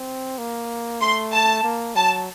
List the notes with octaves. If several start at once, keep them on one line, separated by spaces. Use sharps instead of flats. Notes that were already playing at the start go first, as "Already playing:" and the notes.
Already playing: C4
A#3
A3 C6
A5
A#3
F#3 A5